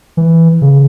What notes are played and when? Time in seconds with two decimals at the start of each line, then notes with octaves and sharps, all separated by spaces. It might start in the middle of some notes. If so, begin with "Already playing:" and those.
0.17 E3
0.62 C#3